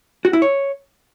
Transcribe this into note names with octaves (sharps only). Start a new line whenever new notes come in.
F#4
E4
C#5